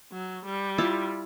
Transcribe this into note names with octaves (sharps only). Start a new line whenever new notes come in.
F#3
G3
E4 F4 A5